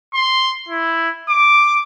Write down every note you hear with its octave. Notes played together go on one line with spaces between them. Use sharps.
C6
E4
D6